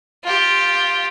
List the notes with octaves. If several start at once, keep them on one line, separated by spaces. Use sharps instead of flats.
F4 G4